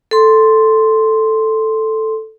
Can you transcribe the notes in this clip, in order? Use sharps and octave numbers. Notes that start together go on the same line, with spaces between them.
A4 C6